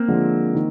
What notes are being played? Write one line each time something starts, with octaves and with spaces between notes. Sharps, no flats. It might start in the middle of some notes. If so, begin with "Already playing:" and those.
Already playing: A#3 C4
D3 F3 G#3
D#3